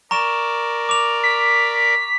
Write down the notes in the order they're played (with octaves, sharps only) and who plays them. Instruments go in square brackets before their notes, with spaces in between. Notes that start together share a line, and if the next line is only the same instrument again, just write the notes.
[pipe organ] A#4 D5 [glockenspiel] A#5 C#6 E7
[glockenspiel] D6 F7
[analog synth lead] B6